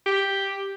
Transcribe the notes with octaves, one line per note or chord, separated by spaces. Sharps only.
G4